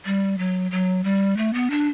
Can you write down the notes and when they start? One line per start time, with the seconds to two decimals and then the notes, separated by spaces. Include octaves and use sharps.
0.06 G3
0.38 F#3
0.71 F#3
1.04 G3
1.37 A3
1.54 B3
1.71 D4